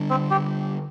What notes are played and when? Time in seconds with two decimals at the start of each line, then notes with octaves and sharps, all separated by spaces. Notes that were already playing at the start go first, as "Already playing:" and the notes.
Already playing: D3 G3 D4
0.10 C4
0.31 G4